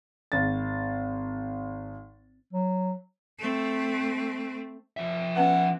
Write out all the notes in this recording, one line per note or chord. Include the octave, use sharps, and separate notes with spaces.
G#1 A6
F#3
A3 C4
F3 E5
B3 C#4 B4 F#5